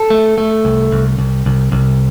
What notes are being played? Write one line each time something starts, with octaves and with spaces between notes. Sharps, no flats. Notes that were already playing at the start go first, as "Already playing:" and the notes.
Already playing: A4
A3
A3
C2
C2
C2
C2
C2